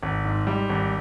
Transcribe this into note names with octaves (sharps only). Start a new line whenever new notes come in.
G#1
G#2
G3
G#1